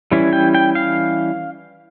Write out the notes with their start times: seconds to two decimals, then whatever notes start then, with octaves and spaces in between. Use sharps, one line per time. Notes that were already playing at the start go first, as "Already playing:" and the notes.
0.12 E3 G3 C#4 E4
0.33 G5
0.55 G5
0.75 F5